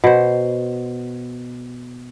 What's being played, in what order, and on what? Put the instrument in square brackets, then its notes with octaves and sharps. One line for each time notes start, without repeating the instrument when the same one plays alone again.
[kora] B2 C5